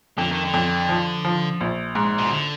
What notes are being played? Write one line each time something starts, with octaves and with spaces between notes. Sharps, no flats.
F2 D3
D#3
D3
F2
F3
F3
A#1
G#2
B2
D3